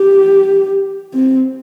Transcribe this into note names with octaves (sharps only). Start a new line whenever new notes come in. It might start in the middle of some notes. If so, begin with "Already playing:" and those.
Already playing: G4
C4